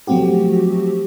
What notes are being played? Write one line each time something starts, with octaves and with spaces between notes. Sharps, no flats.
F3 F#3 A3 C4 F#4 G4